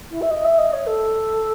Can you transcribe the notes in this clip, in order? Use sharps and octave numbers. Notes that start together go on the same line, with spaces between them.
E4
E5
D#5
E5
D#5
C#5
A4